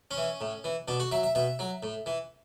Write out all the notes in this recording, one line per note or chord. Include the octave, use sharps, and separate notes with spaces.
C#4
E3
A2
E3
B2 D4
F#4
F#3 E5
E5
B2 E5
F#3
A2
E3